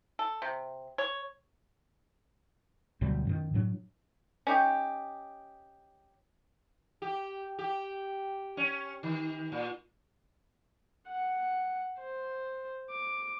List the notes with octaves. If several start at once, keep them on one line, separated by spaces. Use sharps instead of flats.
A4
C3
C#5
D2 B2 F#3 G3
F#2 D#3
A2 F#3 D4
C#4 D#4 G4
G4
G4
C#4
D#3
A#2
F#5
C5
D6